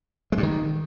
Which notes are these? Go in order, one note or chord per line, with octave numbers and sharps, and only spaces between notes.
G#3
G2
D#3